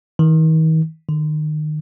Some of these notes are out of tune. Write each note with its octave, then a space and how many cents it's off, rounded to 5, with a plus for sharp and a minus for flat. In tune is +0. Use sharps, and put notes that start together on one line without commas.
D#3 +40
D#3 -30